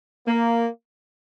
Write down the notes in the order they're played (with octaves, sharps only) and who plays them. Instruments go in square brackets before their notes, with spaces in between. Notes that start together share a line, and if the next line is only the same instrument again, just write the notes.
[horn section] A#3